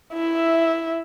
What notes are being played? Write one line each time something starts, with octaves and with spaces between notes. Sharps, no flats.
E4 E5